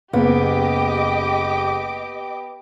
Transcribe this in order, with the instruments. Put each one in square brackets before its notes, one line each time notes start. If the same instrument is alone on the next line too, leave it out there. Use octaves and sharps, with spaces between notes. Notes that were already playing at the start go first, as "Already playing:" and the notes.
[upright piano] F#1 [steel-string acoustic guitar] B3 [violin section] G4 D#5 D6